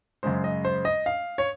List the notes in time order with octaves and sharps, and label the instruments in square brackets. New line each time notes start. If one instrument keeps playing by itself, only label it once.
[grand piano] F#2 C#3 G#3 C5
D#5
C5
D#5
F5
C#5